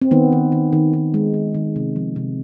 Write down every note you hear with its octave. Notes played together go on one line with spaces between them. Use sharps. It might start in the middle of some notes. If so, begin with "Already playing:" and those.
C4
D#3 B3
D#3
D#3
D#3
D#3
G#3
D#3
D#3
C3
F3
C3